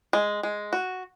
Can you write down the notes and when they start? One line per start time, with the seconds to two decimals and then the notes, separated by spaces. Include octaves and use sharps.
0.13 G#3
0.43 G#3
0.73 F#4